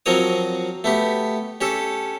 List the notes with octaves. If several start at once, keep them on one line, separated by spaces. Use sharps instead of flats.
F3 F#3 C4 A#4 C#5 D#6
A3 B3 G4
C#4 G4 A4